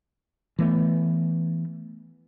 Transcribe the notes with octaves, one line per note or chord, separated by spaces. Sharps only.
E3 A3 B3